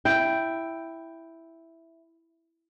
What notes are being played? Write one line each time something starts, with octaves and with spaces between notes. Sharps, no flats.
E4 G5